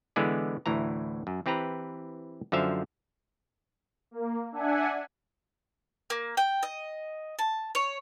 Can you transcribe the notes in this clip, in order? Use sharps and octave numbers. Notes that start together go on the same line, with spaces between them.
D3 E3 G#3 B3 D5
D2 A2 E3 A#5
F#2
E3 C4 G4 B4 A#5
F#2 D3 F3 C5 E5 F5
A#3
D4 E5 F#5 G#5
A#3
G5
D#5
A5
C#5